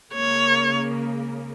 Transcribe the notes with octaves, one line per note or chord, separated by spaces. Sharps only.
C#2 C#3 A#3 C#5